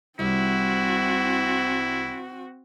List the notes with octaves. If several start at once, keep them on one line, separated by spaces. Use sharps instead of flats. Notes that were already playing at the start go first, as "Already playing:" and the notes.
C2 C4 E4 F#4